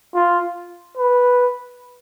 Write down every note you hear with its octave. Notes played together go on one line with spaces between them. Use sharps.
F4
B4